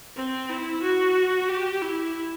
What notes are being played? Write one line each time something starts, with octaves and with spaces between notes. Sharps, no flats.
C4
E4
F#4
G4
E4